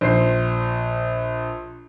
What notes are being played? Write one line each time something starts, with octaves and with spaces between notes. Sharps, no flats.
A#1 C5 C7